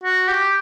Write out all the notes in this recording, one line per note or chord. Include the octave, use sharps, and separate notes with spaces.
F#4
G4